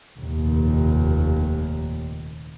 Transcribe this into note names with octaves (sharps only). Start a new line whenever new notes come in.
F1 D#2 A#2